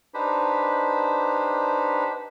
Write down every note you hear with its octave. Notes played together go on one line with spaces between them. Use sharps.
D4 D#4 G4 B4 C5 B5